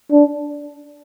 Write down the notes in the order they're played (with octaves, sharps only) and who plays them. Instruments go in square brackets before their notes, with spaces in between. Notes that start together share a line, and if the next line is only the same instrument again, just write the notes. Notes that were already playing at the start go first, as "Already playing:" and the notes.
[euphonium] D4